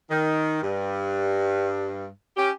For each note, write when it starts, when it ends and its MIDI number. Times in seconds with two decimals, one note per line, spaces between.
0.11 0.60 51
0.62 2.06 43
2.37 2.50 61
2.37 2.50 67